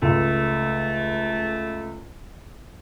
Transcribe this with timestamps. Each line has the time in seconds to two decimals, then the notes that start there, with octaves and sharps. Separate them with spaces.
0.02 C#2 A3